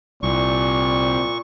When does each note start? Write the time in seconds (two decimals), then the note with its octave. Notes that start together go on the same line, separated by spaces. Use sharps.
0.23 C2 A#2 D5 C#6